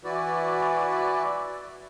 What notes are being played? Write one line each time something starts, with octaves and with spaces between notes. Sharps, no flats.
E3 E4 F#4 B4 D5